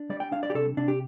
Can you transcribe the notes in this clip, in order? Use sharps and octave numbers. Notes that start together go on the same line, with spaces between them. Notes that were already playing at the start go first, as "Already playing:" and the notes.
Already playing: D4
G3 D5
G5
D4 F5
D5
G4
C3 A4
C3 D4
G4